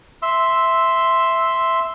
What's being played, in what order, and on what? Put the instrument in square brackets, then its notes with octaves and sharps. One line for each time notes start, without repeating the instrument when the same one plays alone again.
[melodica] E5 C6 E6